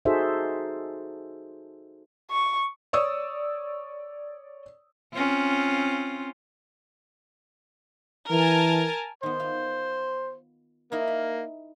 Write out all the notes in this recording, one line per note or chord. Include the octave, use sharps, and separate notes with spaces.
D#4 F#4 G#4 A4 C5 E5
C#6
C#5 D5 C#6 D#6 E6
C4 C#4 F4
E3 A#4 G#5 A5
D#3 B3 C5
F4
A#3 D#4 E4 A#4
B5